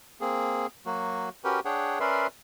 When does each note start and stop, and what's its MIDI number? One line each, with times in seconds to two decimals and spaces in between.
0.21 0.66 58
0.21 0.66 60
0.21 0.66 68
0.86 1.29 54
0.86 1.29 58
0.86 1.29 66
1.44 1.60 61
1.44 1.60 66
1.44 1.60 67
1.44 1.60 70
1.44 1.60 71
1.44 1.60 79
1.65 1.99 62
1.65 1.99 68
1.65 1.99 73
1.65 1.99 78
1.65 1.99 79
2.00 2.27 61
2.00 2.27 70
2.00 2.27 71
2.00 2.27 74
2.00 2.27 76
2.00 2.27 84